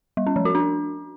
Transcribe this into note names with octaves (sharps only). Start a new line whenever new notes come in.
G3
C#4
F3
F#4
D4